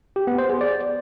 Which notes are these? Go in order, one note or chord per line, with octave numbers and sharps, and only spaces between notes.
G4
B3
C5
G#4
D5